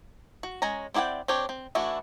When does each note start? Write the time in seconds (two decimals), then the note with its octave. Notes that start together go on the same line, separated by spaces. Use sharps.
0.43 F#4
0.62 G#3 C#4 G#5 A#5
0.94 C4 E4 D5 F#5 G5
1.28 C4 D4 G4 C#5
1.49 C4
1.75 E3 A3 D4 E4 F#4